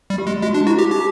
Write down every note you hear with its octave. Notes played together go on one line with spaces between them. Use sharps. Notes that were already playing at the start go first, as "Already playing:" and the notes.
G3
G4
G#3
G#3 F#4
D4
E4 F#4
G4
D#4 G4